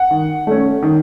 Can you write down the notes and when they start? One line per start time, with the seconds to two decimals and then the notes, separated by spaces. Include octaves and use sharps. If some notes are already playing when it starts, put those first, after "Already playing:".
Already playing: F#5
0.11 D#3
0.47 A3 C#4
0.83 D#3